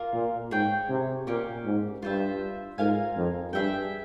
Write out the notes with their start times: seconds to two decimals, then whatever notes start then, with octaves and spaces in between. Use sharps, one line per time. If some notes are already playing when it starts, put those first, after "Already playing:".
Already playing: A#3 F4 A#4 F5
0.13 A#2
0.51 G#2 G#4 C#5 G5
0.89 C3
1.27 A#2 A#3 C#4 G4
1.65 G#2
2.02 G2 F4 C5 E5
2.78 G#2 F4 A#4 F5 G#5
3.16 F2
3.53 G2 G#4 E5 G5